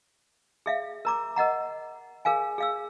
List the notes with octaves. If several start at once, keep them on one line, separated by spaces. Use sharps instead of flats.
G#4 E5 F5
A#4 A#5 D6
A#4 D#5 F#5 A#5
G#4 A#4 F5 G#5
G#4 F5 E6